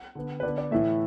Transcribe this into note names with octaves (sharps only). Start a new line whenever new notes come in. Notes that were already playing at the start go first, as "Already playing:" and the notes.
Already playing: F#5
D3 B3
B4
D3 B3 D5
D5
A2 E3 A3 E5